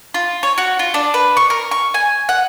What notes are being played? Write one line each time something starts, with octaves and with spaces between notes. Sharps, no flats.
F4
C#5
F#4
F4
D4
B4
C#6
A#4
C#6
G#5
F#5